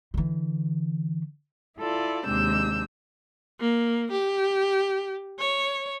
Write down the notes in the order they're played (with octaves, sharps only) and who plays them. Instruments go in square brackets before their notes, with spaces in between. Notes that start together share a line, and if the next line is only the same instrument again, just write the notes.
[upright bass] D3 E3
[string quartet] E4 F4 A4 D5
D#2 C3 G#3 D4 E6 G6
[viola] A#3
G4
C#5